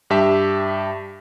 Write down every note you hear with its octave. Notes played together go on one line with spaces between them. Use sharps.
G2 G4 E5 A5